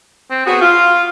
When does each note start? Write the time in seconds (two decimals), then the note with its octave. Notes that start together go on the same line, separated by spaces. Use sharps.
0.30 C4
0.46 B3 F#4 G#4
0.61 F4 F5